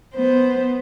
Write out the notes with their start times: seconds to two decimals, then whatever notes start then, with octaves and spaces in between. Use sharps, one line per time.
0.14 B3 C5